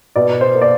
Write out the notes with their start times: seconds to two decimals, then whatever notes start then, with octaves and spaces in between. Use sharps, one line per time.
0.16 B2 D5
0.41 C5
0.55 A#3
0.61 D5